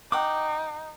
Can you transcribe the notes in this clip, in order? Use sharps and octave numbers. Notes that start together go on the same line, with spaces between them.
D#4 F#5 G5 D6